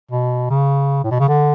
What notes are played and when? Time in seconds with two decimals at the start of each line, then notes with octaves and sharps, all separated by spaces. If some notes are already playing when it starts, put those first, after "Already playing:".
0.11 B2
0.50 C#3
1.04 A2
1.11 B2
1.19 C#3
1.28 D3